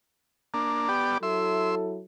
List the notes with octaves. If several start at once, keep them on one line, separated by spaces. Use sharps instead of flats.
A#3 D4
B3 G4 D5
F#3 E4 A4 E5 C6